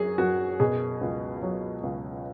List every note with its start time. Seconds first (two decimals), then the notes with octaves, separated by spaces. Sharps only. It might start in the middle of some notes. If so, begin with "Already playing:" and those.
Already playing: F#2 F#3 G#4
0.18 F#2 F#4
0.60 B2 G#4
1.01 C#2
1.42 F#3
1.83 C#2